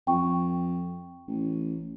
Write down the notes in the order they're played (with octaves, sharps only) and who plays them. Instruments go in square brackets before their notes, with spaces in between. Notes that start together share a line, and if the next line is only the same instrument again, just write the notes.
[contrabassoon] F2 [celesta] G5 C#6
[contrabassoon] A1